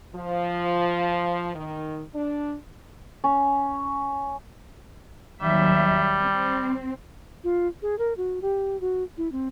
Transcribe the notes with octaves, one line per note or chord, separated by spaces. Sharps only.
F3
D#3
D4
C#4
D#2 F#3 G3 E5
C4
F4
G#4
A#4
F#4
G4
F#4
E4
C4